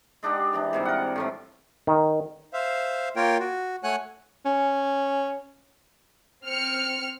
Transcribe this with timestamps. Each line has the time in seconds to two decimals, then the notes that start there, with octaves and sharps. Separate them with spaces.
0.23 G#3 D4 D#4 G4
0.53 E3 F3 D4
0.73 G#2 C3 G3
0.85 A#4 F#5
1.16 A2 F3 G3
1.87 D#3
2.53 C5 E5 F5
3.16 A#3 F4 A#4 C#5 G5
3.40 F#4
3.84 A3 C#5 F#5 G#5 F#6
4.45 C#4
6.45 C4 F6 C#7